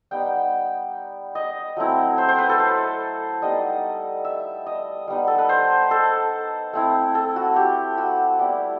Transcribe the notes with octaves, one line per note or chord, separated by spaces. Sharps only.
G3 B3 D#4 G5
D#5
F#3 A3 C4 E4
C5
C5
B4
A4
C5
G3 B3 D#4 D#5
E5
D#5
G3 B3 D#4
A4
B4
C5
A4
A3 C4 E4
A4
F#4
G4
F#4
G3 B3 E4 G4